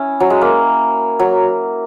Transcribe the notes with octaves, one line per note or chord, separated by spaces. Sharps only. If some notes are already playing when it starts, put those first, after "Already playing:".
Already playing: C#4 E4
F#3
G#3
A#3
F#3